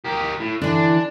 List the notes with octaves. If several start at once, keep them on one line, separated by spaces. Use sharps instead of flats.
G4 A#4
A2
D3 E3 D4